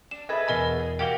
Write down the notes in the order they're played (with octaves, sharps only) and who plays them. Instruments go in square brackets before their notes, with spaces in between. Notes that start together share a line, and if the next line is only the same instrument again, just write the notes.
[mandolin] D4 [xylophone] E7
[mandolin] G#4 A4 B4 [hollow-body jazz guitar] D#5 E5
[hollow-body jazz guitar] E2 B2 B5 [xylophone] A#4 D#5 G#5
[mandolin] G#4
[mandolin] A#3 F#4 G4 [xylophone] G5 G7